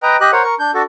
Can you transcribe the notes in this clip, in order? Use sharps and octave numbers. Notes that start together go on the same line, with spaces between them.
B4 D#5 G5 A#5
G4 D#5 F#6
A#4 C5 C#5 F#5
A#4 C#6
D4 G6
D4 F#4 A4